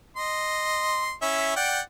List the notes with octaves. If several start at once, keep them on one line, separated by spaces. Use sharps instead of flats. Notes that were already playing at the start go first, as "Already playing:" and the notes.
D#5 C6
C#4 E4 E5
D5 F#5 G5